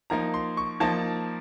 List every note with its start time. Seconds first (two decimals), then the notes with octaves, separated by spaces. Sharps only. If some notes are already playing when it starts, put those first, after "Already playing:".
0.10 F3 A#3 D#4 A#5
0.34 C6
0.57 C#6
0.80 F3 A#3 D#4 A5